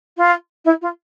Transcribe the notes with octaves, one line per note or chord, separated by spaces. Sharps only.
F4
E4
F4